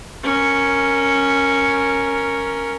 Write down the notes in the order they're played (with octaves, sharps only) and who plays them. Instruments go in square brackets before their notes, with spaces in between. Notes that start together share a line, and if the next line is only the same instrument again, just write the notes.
[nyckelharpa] C#4 A#4